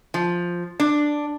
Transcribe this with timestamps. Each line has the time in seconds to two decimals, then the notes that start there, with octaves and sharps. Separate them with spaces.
0.14 F3
0.80 D4